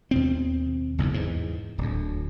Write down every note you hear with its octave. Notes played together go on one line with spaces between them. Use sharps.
D#2 B2 C4
F#1 B1 E2 G#2
E2 G#2
D1 D2